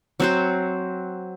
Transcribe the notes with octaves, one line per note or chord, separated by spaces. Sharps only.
F#3 C4 F#4 C5